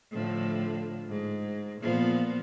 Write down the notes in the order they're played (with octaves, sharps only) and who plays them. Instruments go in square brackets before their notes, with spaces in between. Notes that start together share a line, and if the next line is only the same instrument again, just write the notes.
[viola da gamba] A2 D3 F3
G#2
A#2 F3 B3